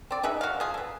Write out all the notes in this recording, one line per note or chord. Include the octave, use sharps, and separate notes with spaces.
C4 D5
D#4 G#4 B4 E5
F#4 F5
F3 G#4
A4 B4